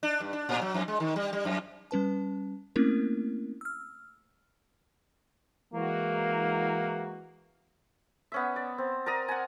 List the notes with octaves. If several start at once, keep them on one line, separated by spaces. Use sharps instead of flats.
D4
G2
D4
A2
F#3
F2
G#3
D#3
G3
G3
F2
G3 C#4 B4 A5
A3 A#3 C4 C#4 E4 A#4
E6 F6
E3 G#3 A#3 F#4
B3 C#4 E5
D5
C4
A#4 D5 A#5 D#6
F#5 G#5